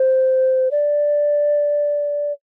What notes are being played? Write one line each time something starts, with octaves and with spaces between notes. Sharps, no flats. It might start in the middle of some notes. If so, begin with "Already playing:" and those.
Already playing: C5
D5